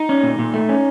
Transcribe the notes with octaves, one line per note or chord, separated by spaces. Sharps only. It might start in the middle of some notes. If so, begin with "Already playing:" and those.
Already playing: D#4
C#4
A#2
A#2
A3
C#4